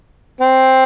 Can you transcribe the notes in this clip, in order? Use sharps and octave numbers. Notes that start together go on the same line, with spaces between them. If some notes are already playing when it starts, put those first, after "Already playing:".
C4